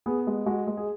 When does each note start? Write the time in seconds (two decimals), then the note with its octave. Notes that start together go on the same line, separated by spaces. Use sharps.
0.06 B3 G#4
0.27 G#3
0.46 G#3 F#4
0.67 G#3
0.77 G#4